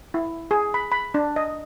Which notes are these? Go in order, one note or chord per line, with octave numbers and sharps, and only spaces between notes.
E4
G#4
B5
B5
D4
D#5